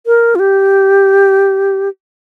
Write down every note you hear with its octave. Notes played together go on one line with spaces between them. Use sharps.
A#4
F4
G4